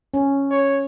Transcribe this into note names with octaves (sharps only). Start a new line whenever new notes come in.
C#4
C#5